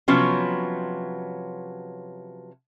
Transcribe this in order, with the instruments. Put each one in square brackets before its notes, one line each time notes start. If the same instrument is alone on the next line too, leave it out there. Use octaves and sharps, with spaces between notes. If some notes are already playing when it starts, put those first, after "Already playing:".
[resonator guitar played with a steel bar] C3 F3 F#3 B3 C#4